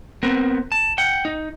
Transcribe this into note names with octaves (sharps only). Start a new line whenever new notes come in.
B3 C4 A#4
A5
F#5 G5
D#4